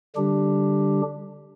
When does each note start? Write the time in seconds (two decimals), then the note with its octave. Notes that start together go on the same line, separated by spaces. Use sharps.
0.16 D3 G3 D4 G4